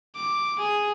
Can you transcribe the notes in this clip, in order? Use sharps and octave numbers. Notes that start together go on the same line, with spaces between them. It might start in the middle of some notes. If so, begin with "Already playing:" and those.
D6
G#4